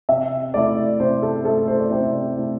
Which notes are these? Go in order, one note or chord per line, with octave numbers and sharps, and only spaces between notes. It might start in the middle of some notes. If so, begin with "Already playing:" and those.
C3 E5
A3 E4 D5
C3 C5
A4
A3 E4 A4
C5
D5
C3 C5
A3 E4